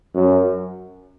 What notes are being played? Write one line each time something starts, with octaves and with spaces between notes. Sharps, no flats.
F#2